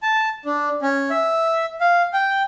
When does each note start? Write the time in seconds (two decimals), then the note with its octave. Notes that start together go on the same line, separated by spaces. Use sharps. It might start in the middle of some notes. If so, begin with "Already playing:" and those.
0.03 A5
0.45 D4
0.82 C#4
1.10 E5
1.81 F5
2.13 G5